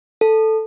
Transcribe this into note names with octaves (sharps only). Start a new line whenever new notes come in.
A4